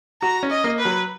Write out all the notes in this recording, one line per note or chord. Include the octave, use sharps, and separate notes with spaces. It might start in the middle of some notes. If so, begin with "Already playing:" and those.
F#4 A#5
C#4
D#5
A#3
B4
F#3